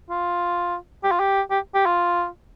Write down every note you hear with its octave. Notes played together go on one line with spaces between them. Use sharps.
F4
G4
F4
G4
G4
G4
F4